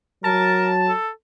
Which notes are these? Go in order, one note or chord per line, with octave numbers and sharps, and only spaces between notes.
F#3 A#4 A5
A4